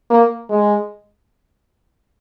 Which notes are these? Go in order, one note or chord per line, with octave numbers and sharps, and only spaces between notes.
A#3
G#3